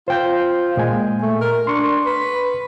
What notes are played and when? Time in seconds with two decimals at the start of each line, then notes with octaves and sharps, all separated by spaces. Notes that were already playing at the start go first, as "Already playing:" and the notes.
0.08 F4 C5 G5 G6
0.77 A#2 G#3 G#5
1.22 A3
1.41 A#4
1.67 D4 C6 C#6
2.06 B4